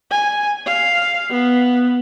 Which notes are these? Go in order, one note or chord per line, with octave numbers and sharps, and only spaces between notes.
G#5
F5
B3